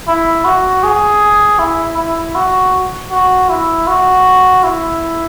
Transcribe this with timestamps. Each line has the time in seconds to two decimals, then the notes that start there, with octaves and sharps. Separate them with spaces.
0.08 E4
0.45 F#4
0.84 G#4
1.59 E4
1.97 E4
2.35 F#4
3.11 F#4
3.49 E4
3.87 F#4
4.64 E4